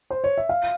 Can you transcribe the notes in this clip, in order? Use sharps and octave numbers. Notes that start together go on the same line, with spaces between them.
C5
C#5
E5
F5